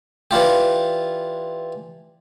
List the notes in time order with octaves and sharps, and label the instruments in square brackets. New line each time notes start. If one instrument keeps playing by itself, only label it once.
[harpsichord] E3 D4 F4 G4